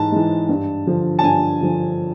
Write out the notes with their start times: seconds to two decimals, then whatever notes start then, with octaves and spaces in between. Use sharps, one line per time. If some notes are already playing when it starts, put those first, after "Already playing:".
Already playing: G#2 E3 A5
0.12 E3 G#3
0.49 G2
0.87 D3 F3
1.19 A5
1.23 G2 G#5
1.61 D3 F3